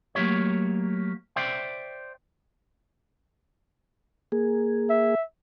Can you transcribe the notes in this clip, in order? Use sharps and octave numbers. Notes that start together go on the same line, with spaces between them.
F#3 A3 A#3 G4 C#5
C5 D5 E5 G5
A#3 G#4
E5